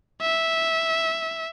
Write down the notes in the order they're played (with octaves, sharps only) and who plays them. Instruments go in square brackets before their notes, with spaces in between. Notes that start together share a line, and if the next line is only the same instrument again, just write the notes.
[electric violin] E5